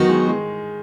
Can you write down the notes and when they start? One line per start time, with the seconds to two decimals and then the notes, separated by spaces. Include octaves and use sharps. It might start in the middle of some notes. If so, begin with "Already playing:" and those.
Already playing: D#3 F#3 B3 D#4 F#4
0.09 G#3
0.28 G#3